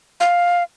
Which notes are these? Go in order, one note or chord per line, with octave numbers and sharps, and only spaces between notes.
F5